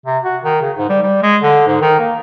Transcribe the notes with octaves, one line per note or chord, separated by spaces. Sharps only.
C3
F#4
D#3
C#3
G#2
G3
G3
G#3
D3
G#2
D#3
A#3